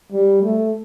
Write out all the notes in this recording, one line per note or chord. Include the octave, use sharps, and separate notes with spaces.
G3
A3